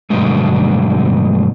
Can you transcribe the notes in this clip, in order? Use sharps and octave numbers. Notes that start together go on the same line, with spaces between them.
G2 B2 D3 F#3 G#3 A3